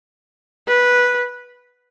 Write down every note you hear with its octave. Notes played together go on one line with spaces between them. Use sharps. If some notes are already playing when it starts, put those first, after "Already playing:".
B4